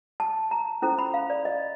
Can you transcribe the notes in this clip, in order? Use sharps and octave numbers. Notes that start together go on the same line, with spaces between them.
A5
A#5
C#4 E4 A4 C5 A#5
B5
F5
D5
D#5